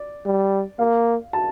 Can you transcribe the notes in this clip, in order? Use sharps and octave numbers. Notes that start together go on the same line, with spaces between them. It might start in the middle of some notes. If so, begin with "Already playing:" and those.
Already playing: D5
G3
A#3 F5
A5